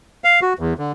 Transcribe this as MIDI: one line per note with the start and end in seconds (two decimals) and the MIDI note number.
0.24 0.40 77
0.42 0.53 66
0.59 0.74 40
0.79 0.92 50